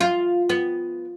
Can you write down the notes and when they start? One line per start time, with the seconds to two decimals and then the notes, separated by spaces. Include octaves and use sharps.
0.01 F4
0.49 B3